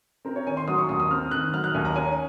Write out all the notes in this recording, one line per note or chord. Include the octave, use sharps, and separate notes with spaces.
C4 A#4
C#5
D#3 G#5
C6
F#3 D#6
C6
C#6
D#2 D#6
D#6
C4 F6
D#3 F#6
F#3 F6
F#6
D#2 G#5
A#5
C#4 G#5